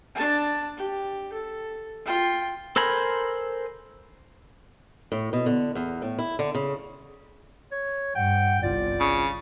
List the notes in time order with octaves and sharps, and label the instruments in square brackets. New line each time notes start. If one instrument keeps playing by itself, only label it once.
[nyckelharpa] D4 A5
G4
A4
F4 G5
[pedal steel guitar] A4 A#4 C5 G#5 B5
[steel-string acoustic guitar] A2
B2
D3
E2
A2
E4
D3
C#3
[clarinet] C#5
[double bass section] G2 [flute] F#5 [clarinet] G5
[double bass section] G1 C2 [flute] F4 [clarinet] D5
[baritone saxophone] C#3